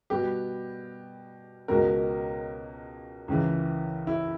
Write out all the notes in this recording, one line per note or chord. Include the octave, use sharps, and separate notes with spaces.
B2 G3 B3 G4
C#2 B2 G#3 A#4
C#2 C#3 E3
E4